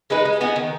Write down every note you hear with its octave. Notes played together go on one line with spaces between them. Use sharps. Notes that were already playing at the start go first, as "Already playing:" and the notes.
G#3 D#4 B4
G#3
B3 D#4 G#4
D#3